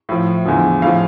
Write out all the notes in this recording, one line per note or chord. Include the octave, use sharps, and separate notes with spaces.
A2 F3
E2 D3 F3
A2 F3 F5